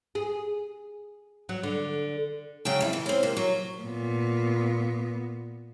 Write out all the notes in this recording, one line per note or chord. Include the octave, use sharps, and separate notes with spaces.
G#4
F#3
D3
C#3 F#3 G5
F2 E4
E3
C4 C#4
C3 A#3
F#3
A#2 B3